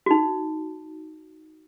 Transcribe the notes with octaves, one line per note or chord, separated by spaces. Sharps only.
D#4 F#4